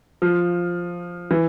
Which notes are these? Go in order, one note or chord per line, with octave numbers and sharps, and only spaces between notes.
F3
E3